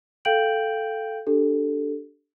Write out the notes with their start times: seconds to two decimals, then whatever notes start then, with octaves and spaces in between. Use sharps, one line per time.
0.25 A4 F5 G5 G6 D7 F#7
1.27 D4 G4 A4